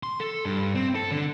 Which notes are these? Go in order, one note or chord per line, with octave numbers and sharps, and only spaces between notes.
C6
A4
G2
C4
A4
D3